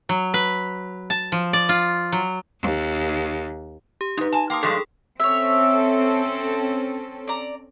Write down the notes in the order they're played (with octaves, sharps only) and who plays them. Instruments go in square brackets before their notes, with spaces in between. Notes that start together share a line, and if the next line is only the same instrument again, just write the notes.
[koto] F#3
B4
A5
F3
D5
F4
F#3
[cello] D#2
[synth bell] G4
[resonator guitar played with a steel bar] F2 G#2 [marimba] D#4 B4
[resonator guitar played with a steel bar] G#5 A5
[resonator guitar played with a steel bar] A#3 [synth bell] G5 C6 D#6
[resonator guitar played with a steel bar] G2 F3 G#3 [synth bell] G#4 A4
[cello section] C4 C#4 A4 [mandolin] C#5 E5
[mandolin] D5 A#5